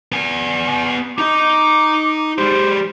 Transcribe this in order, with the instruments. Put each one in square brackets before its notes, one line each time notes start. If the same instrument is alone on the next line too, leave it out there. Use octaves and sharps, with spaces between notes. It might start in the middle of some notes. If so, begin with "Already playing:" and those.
[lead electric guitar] B3 G#5
[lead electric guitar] D#4 D#5 [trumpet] D6
[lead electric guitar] G#3 G4 [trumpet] C5